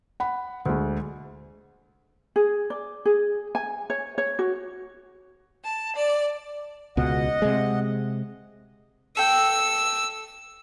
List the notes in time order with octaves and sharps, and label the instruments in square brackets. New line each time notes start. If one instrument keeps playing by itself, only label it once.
[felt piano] F#5 B5
D2 G#3
[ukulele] G#4
D5
G#4
G#5
C#5
C#5
F#4
[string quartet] A5
D5
[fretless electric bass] C#2 B2 [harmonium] D#5 F#5
[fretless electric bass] C3 G#3
[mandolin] A4 G5 [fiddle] E6